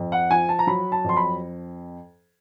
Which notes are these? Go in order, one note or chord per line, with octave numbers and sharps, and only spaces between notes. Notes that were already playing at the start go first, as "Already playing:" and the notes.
Already playing: F2
F#5
F3 G#5
A5
A#5
F#3 B5
A5
F2 C6
B5